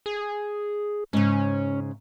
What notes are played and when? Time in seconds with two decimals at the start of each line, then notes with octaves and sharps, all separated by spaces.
0.06 G#4
1.13 G#2 C#3 C#4